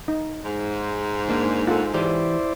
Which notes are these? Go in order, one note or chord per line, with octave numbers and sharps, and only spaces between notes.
D#4
G#2
A#3 D4
F4 A4 F#5
E3 E4 G4 C5 D5